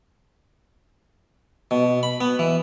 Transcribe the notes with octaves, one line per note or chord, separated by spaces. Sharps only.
B2
B5
B3
E3